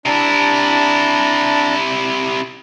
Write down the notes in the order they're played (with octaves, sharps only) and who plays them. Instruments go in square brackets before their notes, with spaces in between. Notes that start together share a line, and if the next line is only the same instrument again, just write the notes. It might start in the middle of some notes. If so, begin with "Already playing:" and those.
[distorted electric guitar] C3 E4 [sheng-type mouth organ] D4 A5 A#5